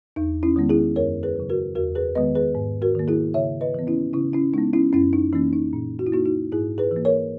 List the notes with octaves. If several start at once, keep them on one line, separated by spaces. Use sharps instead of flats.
E2 D#4
C#4 E4
D#3 G#3 B3
E4 G#4
F#2 A#4 C#5
G#4 B4
C#3 F#3
F#4 A#4
E2 F#4 A#4
G#4 B4
D#3 G#3 B3 B4 D#5
G#4 B4
G#2
F#4 A#4
D#3 A#3
E4 G#4
C#3 C#5 E5
B4 D#5
E3 B3
C#4 E4
C#3 C#4 E4
C#4 E4
G#3 B3 D#4
C#4 E4
F#2 C#4 E4
D#4
E3 A#3 C#4
D#4
A#2
F#4
E4
A#3 D#4 F#4
D#4 F#4
G#2 E4 G#4
G#4 B4
E3
A#3
A#4 C#5